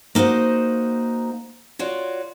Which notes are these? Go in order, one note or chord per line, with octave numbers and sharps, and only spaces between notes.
A#3 D#4 F#4 C5 F#5
F4 F#4 C#5 D5